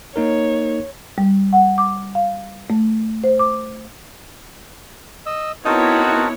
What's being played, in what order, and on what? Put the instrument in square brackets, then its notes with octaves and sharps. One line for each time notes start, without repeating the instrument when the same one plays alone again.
[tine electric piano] A#3 D#4 A#4 [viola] C#5
[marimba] G3
F#5
D6
F5
A3
C5
D6
[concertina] D#5 E6
[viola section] B3 E4 C#5 [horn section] C4 D#4 F#4 [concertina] A#4 A5